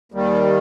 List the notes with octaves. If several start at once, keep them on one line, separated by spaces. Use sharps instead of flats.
D#2 D#3 G3